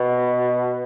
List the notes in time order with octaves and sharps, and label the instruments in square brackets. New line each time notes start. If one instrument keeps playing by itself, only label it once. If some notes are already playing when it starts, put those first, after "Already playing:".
Already playing: [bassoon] B2